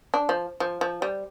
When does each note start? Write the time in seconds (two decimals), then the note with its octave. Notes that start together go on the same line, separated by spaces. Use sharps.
0.14 D4
0.29 F3
0.60 F3
0.81 F3
1.02 G3